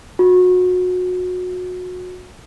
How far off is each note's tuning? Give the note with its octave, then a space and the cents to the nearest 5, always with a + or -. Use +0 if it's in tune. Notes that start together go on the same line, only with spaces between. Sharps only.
F#4 -30